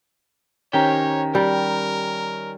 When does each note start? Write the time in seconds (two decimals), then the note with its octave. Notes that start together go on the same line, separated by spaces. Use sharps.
0.73 D#3 C#4 G4 C5 C#5 G5 A#5
1.35 G3 A#4